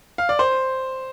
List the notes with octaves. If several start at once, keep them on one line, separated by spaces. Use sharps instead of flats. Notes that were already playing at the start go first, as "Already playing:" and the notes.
F5
D5
C5